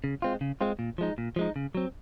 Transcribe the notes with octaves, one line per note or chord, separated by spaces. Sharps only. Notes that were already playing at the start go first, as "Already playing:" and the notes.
C#3
G#3 C4 F4
C#3
G#3 C4 F4
A#2
F3 G#3 D#4
A#2
F3 G#3 D#4
C#3
F#3 C4